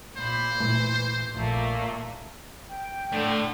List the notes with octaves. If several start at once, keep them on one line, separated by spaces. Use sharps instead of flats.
A#2 C5 B5
A#2 E3 A3
A#1 A#2 A3 A#3
G5
A2 D3